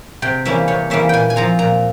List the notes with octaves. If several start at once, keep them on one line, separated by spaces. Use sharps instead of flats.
C3 G5
E3 G3 A#3 C#4 E5
C3 C#5
E3 G3 A#3 C#4 E5
A#2 G5 G#5
G#5
F3 C4 A#5
A#2 A#5